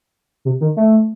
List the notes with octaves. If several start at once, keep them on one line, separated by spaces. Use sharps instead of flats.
C3
D#3
A3